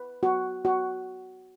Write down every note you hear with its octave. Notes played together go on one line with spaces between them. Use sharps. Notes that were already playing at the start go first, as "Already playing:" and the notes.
Already playing: B4
F#4
F#4